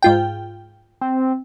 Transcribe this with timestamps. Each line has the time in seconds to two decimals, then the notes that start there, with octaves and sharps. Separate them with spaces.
0.03 G#2 F4 G5
1.01 C4